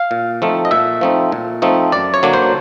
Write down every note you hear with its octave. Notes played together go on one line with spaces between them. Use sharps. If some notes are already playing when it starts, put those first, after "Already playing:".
Already playing: F5
A#2
F3 A3 C4 D#4
D#5
A#2 E5
F3 A3 C4 D#4
A#2
F3 A3 C4 D#4
F#2 D5
C#5
D3 F#3 A#3 D4
C5